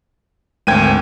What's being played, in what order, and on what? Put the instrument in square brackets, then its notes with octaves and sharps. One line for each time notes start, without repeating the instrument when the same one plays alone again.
[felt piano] G#1 G5 G#6 [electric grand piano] D2 D#7